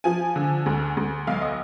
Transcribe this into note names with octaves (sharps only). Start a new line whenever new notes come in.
F3 G#5
D3
D2
D2
B1 F5
D#5